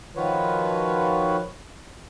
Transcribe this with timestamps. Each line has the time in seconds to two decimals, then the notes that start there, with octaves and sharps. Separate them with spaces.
0.16 D#3 F3 F4 F#4 B4 C#5